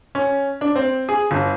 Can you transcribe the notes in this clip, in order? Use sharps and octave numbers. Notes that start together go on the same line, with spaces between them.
C#4
D4
C4
G#4
G1